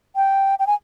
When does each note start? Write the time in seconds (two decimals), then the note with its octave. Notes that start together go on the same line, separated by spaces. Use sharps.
0.16 G5
0.59 G5
0.67 G#5